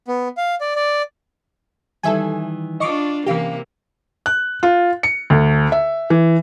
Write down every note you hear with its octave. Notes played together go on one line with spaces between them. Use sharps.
B3
F5
D5
D5
D#3 E3 G3 A4 E5 G#5
D4 F4 D#5 C#6 D6
C3 E3 A#3 C#4 G4 D#5 F5
F#6
F4
C#7
D2
E5
E3